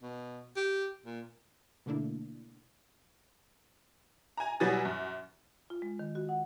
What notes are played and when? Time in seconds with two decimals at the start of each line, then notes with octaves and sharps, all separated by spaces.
0.02 B2
0.57 G4
1.05 A#2
1.86 B2 D3 A3 A#3 D4 E4
4.37 G#5 A#5
4.60 B2 F#3 G3 G#5 A6
4.85 F#2
5.70 F4
5.82 G#3
5.99 D#3
6.15 F#4
6.29 F#5